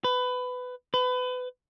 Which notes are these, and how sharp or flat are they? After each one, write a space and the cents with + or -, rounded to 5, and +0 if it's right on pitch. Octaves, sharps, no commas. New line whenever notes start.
B4 +20
B4 +30